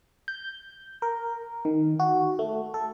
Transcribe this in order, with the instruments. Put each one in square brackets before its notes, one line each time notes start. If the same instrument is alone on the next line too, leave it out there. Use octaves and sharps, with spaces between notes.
[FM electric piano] G6
A#4
D#3
F#4
A3
A4